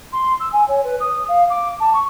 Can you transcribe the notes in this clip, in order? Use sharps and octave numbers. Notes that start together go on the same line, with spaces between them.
C6
E6
G#5
C#5
B4
D#6
F5
D6
A5
C#6